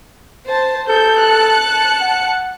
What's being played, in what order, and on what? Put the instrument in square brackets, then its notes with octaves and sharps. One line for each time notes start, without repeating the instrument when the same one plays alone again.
[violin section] C5 A5
[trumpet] A4 [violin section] G6
[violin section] A5 F#6 C#7
[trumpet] F#5